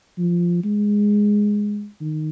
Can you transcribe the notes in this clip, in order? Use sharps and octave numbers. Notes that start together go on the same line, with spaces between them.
F3
G#3
D#3